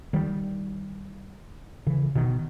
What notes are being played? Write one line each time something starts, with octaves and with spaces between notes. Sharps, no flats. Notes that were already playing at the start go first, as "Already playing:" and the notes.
D#3 G3
C#3 E3
B2 D#3